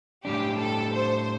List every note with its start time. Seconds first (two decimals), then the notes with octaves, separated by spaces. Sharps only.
0.25 A2 G3 D4 G4
0.59 A4
0.94 C5